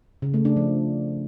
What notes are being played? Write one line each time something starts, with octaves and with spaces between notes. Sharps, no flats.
C#3
A3
D4
F3